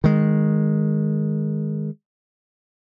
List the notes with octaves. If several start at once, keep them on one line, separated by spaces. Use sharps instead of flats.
D#3 G#3